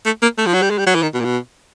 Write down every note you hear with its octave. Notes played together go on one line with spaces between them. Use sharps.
A3
A#3
A3
F3
F#3
G3
G#3
G3
F#3
E3
D#3
B2
A#2
B2